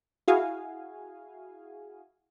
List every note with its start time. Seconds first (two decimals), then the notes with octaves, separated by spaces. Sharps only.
0.28 E4 F#4 G#4 F5 G#5